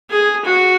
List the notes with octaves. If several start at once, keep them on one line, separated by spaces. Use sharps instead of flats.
G#4
F#4